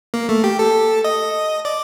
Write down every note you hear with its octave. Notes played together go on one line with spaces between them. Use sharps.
A#3
A3
G4
A4
D#5
D5